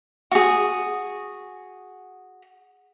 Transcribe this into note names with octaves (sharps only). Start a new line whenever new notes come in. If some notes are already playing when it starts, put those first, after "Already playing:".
F#4 G#4